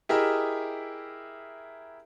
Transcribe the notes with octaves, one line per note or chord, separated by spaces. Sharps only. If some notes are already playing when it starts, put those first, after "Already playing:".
E4 G4 G#4 A#4 D#5 E5